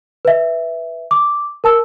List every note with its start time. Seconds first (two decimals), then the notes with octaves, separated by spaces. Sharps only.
0.25 B4 E5
1.11 D6
1.64 A#4 A5 E6